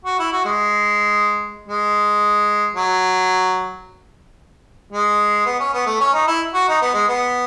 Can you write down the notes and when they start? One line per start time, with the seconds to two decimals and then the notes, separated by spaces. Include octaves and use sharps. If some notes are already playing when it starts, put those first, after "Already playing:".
0.05 F#4
0.19 E4
0.32 F#4
0.45 G#3
1.68 G#3
2.75 F#3
4.92 G#3
5.46 B3
5.60 C#4
5.73 B3
5.86 A3
6.00 C#4
6.13 D#4
6.27 E4
6.54 F#4
6.68 D#4
6.82 B3
6.94 G#3
7.08 B3